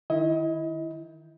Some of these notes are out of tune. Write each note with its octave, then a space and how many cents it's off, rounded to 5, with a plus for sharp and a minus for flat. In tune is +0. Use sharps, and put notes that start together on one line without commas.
D#3 -10 E4 +0 D#5 +30